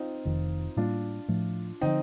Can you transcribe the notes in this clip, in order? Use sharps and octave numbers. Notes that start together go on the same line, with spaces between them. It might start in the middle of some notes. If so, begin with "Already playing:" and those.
Already playing: C4 D#4 F4
F1 F2 D#3
A2 G3 A#3 D4 F4
A2 F3 A3
D3 F3 C4 D#4